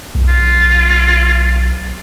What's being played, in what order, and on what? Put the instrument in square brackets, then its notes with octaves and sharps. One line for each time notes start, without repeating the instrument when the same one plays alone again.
[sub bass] B1
[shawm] F4